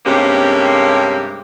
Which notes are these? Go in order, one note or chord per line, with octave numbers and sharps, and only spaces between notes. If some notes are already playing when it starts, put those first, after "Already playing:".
G2 C3 G#3 A#3 C#4 G4